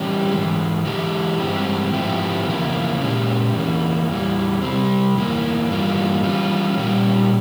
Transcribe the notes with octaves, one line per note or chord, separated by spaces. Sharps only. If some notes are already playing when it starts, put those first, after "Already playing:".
Already playing: E3 G3 C#4 G4
G#2 E3 G#3
E3 G#3 E4 G4
G2 E3 G#3 C4 G4
G#2 F3 C4 E4 G4
E2 C#3 F3 A#3 E4
A#2 G#3 C#4 G4
E2 E3 A#3
E2 E3 G3
C3 G3 C4
E2 E3 A#3
G2 E3 G3 A#3 F4
E3 G3 C#4 F4
A#2 G3 C#4 G4